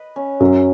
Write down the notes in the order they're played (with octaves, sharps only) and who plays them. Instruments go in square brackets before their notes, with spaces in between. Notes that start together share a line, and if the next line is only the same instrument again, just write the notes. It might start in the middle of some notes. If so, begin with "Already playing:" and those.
Already playing: [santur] B4 D#5
C#4
[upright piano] F#2 [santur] F#3